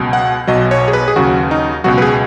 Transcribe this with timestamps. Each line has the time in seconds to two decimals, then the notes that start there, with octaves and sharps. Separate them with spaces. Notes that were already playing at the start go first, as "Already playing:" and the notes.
Already playing: C#2 B2 F#3
0.13 F#5
0.47 B1 B2 F#3 D#5
0.71 C#5
0.88 G#4
0.93 B4
1.08 G#4
1.16 D#2 C#3 F#3 F#4
1.51 D#4
1.84 C#2 B2 F#3 F#4
1.98 B4
2.02 G#4